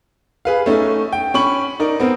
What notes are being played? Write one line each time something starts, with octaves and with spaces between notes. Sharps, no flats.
G#4 B4 F5
A3 C#4 D#4
G5
C#4 B5 C#6 F#7
D#4 A#4 D5
B3 C4 A#4